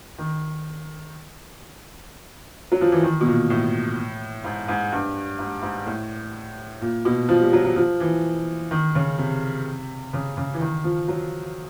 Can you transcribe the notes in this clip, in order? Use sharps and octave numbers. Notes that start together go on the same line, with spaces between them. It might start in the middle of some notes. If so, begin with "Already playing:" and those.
D#3
F#3
F3
E3
D#3
B2
A#2
A2
G#2
G#2
G2
G#2
G#2
A2
A#2
B2
F3
G3
F#3
F#3
F3
E3
D#3
C#3
C3
C#3
C#3
E3
D#3
F3
F#3